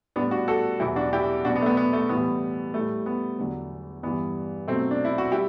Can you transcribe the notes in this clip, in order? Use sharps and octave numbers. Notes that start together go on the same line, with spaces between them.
A2 G3 B3 D4
D4 F#4
F#4 A4
E2 B2 F#3 E4 G4
D4 F#4
E4 G4
B2 F#3 D4 F#4
B3 D4
A3
B3
B3
A3
A2 E3 G3 B3
A2 G3 A3
B3
E2 D3 F#3
G2 E3 G3 B3
B2 F#3 A3 C4
D4
E4
F#4
G3 E4 G4